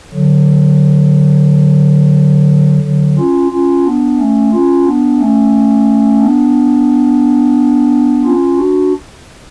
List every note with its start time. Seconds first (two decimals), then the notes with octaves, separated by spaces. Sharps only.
0.14 D3 F#3
2.84 D3 F#3
3.18 C#4 F4
3.52 C#4 F4
3.86 B3 D4
4.19 A3 C#4
4.53 C#4 F4
4.87 B3 D4
5.20 A3 C#4
6.22 B3 D4
8.25 C#4 F4
8.57 D4 F#4